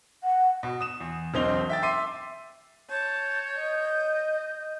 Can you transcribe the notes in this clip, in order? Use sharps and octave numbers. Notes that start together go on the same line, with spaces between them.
F#5
B2
D#6 E7
E2
E1 B1 C4 D#5 F7 G7
E5 G5 A6
E5 C6 D6 C7 D#7
C#5 A5 G6
D#5